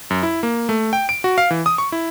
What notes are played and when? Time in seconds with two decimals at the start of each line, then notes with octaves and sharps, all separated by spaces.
0.10 F#2
0.23 E4
0.43 A#3
0.69 A3
0.93 G5
1.09 D7
1.24 F#4
1.38 F5
1.51 E3
1.66 D#6
1.78 C#6
1.92 E4